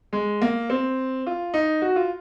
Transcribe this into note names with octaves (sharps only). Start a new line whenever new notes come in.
G#3
A#3
C4
F4
D#4
F#4
F4